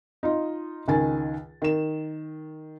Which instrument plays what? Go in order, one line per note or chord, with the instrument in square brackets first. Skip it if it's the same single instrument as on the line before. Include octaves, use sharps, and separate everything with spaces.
[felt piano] D#4 F4 D#5
C#2 D#3 G#5 A6
D#3 E7